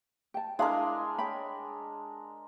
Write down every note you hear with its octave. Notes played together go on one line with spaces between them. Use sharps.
G5 A5
G#3 D4 E4 A#4 F5
C#5 G5 B5